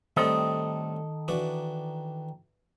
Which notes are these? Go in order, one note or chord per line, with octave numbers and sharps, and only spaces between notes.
A2 D#3 G3 C4 A4 D#5
E3 D4 F#4